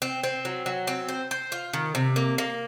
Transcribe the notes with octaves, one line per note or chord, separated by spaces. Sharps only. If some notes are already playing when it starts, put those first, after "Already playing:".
C4
C4
F#3
F#3
C4
C5
C5
F4
D#3
C3
A#3
A#3